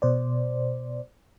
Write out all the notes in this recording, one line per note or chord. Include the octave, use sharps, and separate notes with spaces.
B2 C5 D5